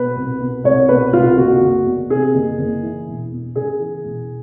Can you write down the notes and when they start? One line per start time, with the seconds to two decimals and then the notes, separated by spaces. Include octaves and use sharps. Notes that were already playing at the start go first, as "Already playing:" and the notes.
Already playing: B2 B4
0.16 C2
0.40 B2
0.64 C2 C#5
0.89 B2 B4
1.13 C2 F4
1.38 F#1 F#4
1.62 F#1
1.86 E2
2.10 C3 G#4
2.35 F#1
2.59 F#1
2.83 E3
3.07 E1
3.31 E2
3.55 C#3 G#4
3.80 E3
4.04 E1